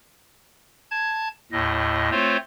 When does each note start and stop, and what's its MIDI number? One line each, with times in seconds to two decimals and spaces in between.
0.91 1.28 81
0.91 1.28 92
1.52 2.10 39
1.52 2.10 45
1.52 2.10 75
2.11 2.37 57
2.11 2.37 60
2.11 2.37 65
2.11 2.37 72
2.11 2.37 73